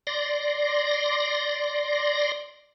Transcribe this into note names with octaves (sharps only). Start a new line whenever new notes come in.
D5 C6 A#6